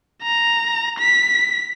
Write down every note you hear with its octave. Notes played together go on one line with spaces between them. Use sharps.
A#5
B6